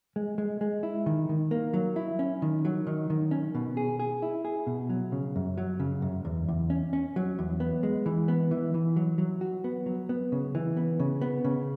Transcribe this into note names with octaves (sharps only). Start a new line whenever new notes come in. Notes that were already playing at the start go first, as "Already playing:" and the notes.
G#3
G#3
G#3
E4
D#3
D#3
A#3
F#3
E4
C#4
D#3
F#3
D#3
D#3
C#4
B2
G#4
G#4
E4
G#4
B2
F#3
C#3
F#2
F#3
C#3
F#2
E2
E2
C#4
C#4
F#3
E2
B3
G#3
E3
B3
E3
E3
F#3
F#3
F#4
B3
F#3
B3
C#3
E3
B3
C#3
B3
C#3